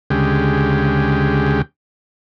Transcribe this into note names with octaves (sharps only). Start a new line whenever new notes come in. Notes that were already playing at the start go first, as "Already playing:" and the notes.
D2 C#3 G#3 G4